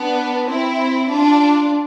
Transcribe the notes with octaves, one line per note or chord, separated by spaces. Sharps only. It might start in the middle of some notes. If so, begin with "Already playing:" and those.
Already playing: B3 D4
C4 E4
D4 F4